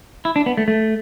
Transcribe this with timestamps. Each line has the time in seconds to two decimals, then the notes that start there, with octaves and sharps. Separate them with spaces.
0.25 E4
0.36 D4
0.46 B3
0.57 A3
0.68 A3